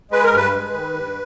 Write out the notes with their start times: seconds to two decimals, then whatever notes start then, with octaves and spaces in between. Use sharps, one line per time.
0.11 G#3 B4
0.24 A#4
0.33 G2 B4
0.53 G#3
0.74 D#3
0.94 G2